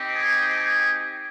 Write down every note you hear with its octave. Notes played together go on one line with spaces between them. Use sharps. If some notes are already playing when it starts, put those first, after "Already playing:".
Already playing: C4 D#4 G4
G#4
G#4